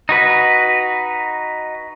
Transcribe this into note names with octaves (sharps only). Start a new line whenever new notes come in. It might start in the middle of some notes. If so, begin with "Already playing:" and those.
D#4 F#4 B4